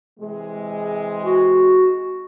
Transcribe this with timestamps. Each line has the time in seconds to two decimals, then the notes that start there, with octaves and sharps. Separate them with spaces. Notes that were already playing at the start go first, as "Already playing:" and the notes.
0.19 C3 E3 G#3
1.24 F#4